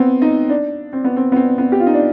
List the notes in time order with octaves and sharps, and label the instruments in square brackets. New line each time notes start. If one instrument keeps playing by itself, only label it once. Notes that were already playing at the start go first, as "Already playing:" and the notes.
Already playing: [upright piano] B3 C4
D#4
D4
C4
B3
C4
B3
C4
B3
G4
F4
D#4
D4